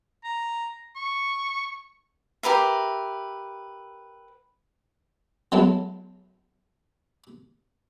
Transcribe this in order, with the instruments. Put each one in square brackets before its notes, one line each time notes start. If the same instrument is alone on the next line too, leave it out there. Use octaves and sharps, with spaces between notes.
[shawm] A#5
C#6
[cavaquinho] G4 A#4 B4 E5
[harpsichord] F#3 G#3 A3 B3 E4